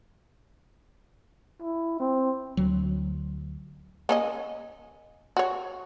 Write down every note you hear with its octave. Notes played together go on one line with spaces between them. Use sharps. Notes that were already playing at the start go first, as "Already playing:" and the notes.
E4
C4
D2 F#3
A#3 C#4 D#5
F#4 C#5